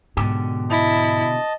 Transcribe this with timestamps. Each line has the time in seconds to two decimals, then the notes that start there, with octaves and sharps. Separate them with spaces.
0.17 G#2 B2 D3 G4
0.70 E4 D#5 A5